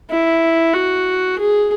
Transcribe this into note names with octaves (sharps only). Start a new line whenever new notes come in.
E4
F#4
G#4